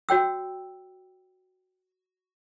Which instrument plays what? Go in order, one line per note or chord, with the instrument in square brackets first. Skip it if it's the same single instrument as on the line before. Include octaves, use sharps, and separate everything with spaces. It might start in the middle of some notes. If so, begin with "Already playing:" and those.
[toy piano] F#4 C#5 G5 E6